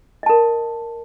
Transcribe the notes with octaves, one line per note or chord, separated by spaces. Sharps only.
A#4 D#5 A5